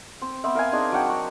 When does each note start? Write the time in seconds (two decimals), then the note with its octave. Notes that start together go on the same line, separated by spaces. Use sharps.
0.22 C4
0.44 B3 C4 E5
0.55 A#4 F5 G#5
0.72 C4 D4 D#4 G#4
0.92 F#3 D4 F#5 G5
1.09 F#4